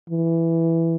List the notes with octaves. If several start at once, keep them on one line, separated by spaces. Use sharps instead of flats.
E3